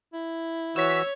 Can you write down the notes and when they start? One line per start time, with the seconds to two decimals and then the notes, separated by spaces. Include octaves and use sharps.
0.13 E4
0.76 E3 F#4 C#5 E6 B6